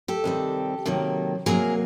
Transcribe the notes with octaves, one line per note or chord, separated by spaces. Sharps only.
G4 A4
C3 D#3 G3 C4
C3 D#3 F#3 A#3
C3 D#3 F#3 A#3 G#4 A#4